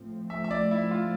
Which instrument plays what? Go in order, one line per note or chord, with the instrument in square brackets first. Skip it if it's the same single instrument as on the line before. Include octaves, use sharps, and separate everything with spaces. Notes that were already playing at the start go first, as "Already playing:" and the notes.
Already playing: [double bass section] A2 F3 A3 C4
[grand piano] E5
E5
D5
E4
F4